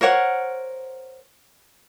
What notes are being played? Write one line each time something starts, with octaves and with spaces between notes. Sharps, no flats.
A#4 C5 C#5 F#5